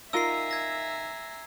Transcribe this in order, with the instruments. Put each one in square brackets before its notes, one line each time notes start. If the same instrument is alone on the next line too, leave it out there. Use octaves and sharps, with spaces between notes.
[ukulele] D#4 F4 A#4 [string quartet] E5 G#5 A#5 [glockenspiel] E6 C7
[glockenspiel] G#6 A#6